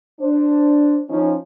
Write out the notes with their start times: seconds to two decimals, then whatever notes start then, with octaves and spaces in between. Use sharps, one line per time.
0.20 D4 C5
1.09 F3 C#4 D#4